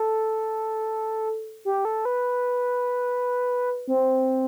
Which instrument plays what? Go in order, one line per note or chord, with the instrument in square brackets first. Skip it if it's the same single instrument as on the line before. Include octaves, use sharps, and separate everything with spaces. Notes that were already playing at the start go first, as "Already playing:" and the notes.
Already playing: [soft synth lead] A4
G4
A4
B4
C4